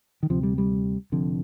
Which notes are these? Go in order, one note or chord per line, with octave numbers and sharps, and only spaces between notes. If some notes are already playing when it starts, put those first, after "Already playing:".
D#3
D2 C3 F3
G3
G3
F1 F2 D3